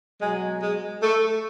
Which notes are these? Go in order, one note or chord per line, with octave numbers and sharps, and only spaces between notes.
B2 F#3 G#3
G#3
A3